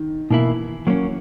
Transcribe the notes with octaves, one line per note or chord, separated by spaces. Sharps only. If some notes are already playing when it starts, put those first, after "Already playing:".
Already playing: D#3
B2 E3 A#3 E4
F#3 A#3 C#4